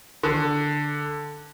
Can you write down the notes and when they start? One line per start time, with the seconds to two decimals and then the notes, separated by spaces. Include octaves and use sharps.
0.23 D3